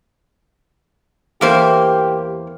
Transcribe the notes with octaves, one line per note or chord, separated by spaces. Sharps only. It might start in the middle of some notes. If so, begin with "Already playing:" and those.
E2 A#3 G4 C5